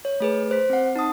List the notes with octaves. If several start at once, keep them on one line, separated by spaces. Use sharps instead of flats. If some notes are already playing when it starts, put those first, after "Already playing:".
C#5
A3 G#4 B4
C5 B6
C4 F#5
D#4 A5 D#6